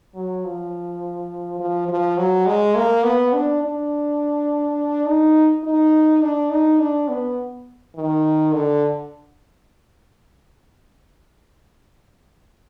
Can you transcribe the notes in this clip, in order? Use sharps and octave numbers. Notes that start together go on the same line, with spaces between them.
F#3
F3
F3
F3
F#3
G#3
A#3
B3
D4
D4
D#4
D#4
D4
D#4
D4
B3
D#3
D3